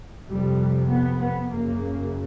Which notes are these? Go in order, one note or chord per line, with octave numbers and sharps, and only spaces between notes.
F2 C3 G3
B3
B3
F#2 C#3 A#3